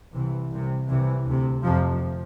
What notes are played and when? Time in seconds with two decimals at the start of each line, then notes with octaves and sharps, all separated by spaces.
0.14 C2 C3 E3
0.51 C2 C3
0.89 C2 C3 E3
1.26 D2 C3
1.64 F2 C3 F3